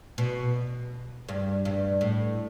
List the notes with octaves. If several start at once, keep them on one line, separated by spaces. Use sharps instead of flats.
B2
G2
G2
A2